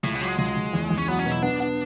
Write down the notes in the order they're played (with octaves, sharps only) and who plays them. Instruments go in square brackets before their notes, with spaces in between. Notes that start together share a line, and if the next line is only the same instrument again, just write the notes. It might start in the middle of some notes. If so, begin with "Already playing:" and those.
[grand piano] C#2 [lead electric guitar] A2
[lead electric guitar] B2
[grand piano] F#3
[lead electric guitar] G#3
[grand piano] C#2 [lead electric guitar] G#3
[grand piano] C#2
E2
E2
[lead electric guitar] C#4
[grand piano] F#3 [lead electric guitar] B3
[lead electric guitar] C#4
[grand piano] B2 [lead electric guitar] E4
[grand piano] B3 [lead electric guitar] D4
[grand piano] B3